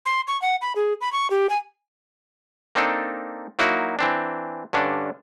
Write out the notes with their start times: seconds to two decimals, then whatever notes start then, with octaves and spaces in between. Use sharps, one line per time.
0.06 C6
0.27 C#6
0.42 F#5
0.62 B5
0.76 G#4
1.01 B5
1.13 C#6
1.30 G4
1.50 G#5
2.75 A#3 C4 D4 D#4 A4
3.59 F#3 A#3 D#4 E4 F#4
3.99 E3 C4 D4
4.73 G2 D3 C#4 D4